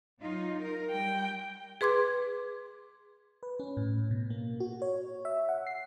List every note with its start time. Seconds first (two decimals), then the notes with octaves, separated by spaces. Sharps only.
0.21 F#3 D#4 F4
0.61 A#4
0.91 G3 G5
1.81 G#4 B4 C6 D6 G#6
3.43 B4
3.60 C#4
3.77 A2
4.11 B2
4.30 A#3
4.60 F#4
4.82 C#5
5.25 E5
5.49 F#5
5.67 C7